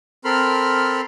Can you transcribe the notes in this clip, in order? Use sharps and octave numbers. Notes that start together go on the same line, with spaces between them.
C4 A4 A#4 B5 C6 F6